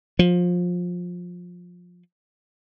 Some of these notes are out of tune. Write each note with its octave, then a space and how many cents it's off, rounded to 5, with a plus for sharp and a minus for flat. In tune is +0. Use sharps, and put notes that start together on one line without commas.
F3 +20